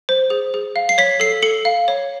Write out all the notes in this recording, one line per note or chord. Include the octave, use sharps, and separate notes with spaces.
C5
G#4
G#4
F5
C7
C#5 B6
A4 C7
A4 C#7
F5
C#5